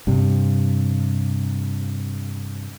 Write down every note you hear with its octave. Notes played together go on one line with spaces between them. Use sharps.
G2 C3